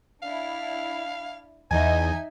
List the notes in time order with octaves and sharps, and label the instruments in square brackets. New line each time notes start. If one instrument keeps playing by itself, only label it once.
[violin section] D4 E4 [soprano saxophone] F5
[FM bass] E2 [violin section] D#4 D#5 E5 [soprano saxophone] G#5